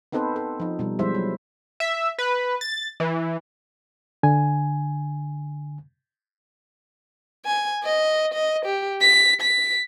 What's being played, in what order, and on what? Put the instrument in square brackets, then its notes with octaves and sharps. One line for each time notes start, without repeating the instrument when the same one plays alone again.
[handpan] B3 C4 D#4 A4 B4 C5
A4
F3 D#4
B2 G3
F3 G3 G#3 E4 C5 E5
F#3
[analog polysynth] E5
B4
A6
E3
[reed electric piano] D3 G#5
[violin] G#5
D#5
D#5
G4
B6
B6